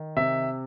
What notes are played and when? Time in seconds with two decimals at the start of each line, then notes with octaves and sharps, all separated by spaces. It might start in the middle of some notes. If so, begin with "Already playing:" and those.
Already playing: D#3
0.16 C3 E5